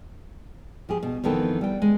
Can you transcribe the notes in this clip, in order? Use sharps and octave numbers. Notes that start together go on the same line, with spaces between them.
F3 G4 G#4
B2
F2 D#3 E3 B3 A4 G5
G3 G5
G#3